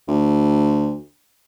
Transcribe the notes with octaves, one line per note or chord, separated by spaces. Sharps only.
D2